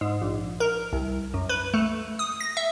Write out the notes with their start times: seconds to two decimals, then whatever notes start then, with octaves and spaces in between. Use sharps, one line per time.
0.01 G#2
0.21 A#1
0.60 A#4
0.93 C2
1.34 F#2
1.49 B4
1.74 A3
2.19 D#6
2.40 A#6
2.57 E5